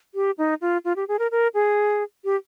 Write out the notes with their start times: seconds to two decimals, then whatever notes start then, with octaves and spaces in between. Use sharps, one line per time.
0.15 G4
0.38 D#4
0.61 F4
0.85 F4
0.96 G4
1.08 G#4
1.19 A#4
1.31 A#4
1.54 G#4
2.25 G4